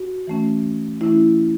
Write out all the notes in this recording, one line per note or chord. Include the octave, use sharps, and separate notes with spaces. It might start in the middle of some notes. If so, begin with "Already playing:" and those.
Already playing: F#4
E3 A3 C#4
E3 A3 C#4 E4